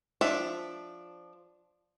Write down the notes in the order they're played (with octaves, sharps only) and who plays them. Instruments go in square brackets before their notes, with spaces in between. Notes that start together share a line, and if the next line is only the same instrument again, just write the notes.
[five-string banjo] F3 D4 E5